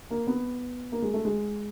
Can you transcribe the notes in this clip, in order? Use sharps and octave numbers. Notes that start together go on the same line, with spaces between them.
A#3
B3
A#3
G#3
A3
G#3